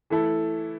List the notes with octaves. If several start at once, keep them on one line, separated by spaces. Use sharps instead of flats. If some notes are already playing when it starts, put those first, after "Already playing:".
E3 A3 E4 A4